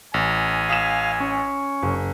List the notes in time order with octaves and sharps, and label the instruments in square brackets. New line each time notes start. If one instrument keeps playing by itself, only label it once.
[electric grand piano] A1 [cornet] G#5
[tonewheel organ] F5 [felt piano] D#6 B6 E7
[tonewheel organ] C#4
[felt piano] F#1